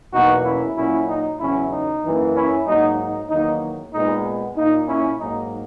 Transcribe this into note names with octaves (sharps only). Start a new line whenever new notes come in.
E2 B2 F#3 A#3 D#4 F#4
C#4 E4
A#2 F#3 A#3 C#4 E4
D#4
E2 C#3 F#3 C#4 E4
D#4
F#2 E3 A#3
C#4 E4
G#2 F#3 A#3 D#4
D#4
E2 D#3 F#3 A#3 D#4
A#2 G#3 B3 D#4
A#2 A#3 D#4
C#4 E4
G#2 F#3 A#3 D#4